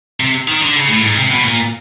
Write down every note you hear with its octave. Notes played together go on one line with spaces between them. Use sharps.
C3
D#3
D3
C#3
A2
G#2
C3
B2
A#2